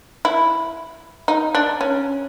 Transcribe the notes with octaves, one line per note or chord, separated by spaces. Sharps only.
E4
D#4
D4
C#4